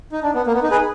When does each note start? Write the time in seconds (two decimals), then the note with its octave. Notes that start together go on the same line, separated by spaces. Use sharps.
0.12 D#4
0.23 D4
0.34 B3
0.47 A#3
0.54 B3
0.63 D#4
0.71 G#4 B4